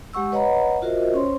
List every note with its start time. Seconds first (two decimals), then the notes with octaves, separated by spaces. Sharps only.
0.14 G#3 G4 F#5 C#6 E6
0.32 B4 C#5 D#5 F#5 A#5 B5
0.82 F4 F#4 A#4 C5 D#5 E5
1.14 C#4 C5 C#5 C6